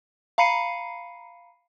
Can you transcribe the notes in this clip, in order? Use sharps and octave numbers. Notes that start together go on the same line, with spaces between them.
F5 A#5 B5 C7 C#7 D#7